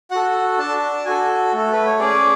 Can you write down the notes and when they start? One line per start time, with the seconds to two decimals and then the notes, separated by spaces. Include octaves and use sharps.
0.11 F#4 A4 F#5
0.58 D4 A5
1.05 F#4 A4 G#5
1.53 A3
1.58 A4
1.72 B4
1.86 C#5
1.99 C#4 G#4 D5